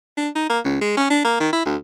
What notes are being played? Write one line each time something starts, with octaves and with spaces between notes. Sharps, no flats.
D4
D#4
A#3
C#2
G#3
C#4
D4
A#3
D#3
E4
D2